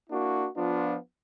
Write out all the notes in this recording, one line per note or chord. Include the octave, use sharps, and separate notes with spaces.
A#3 D4 E4 F#4
F3 B3 D4 F4